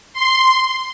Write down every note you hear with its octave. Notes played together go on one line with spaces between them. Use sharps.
C6